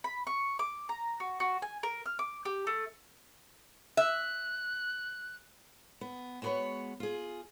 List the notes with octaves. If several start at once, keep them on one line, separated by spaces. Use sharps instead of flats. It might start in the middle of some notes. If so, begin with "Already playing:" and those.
B5
C#6
D6
A#5
F#4
F#4
G#5
A#4
F6
D6
G4
A3
E5 F#6
B3
G#3 B3 F#4 G#4 B4 C#5
F4 G#4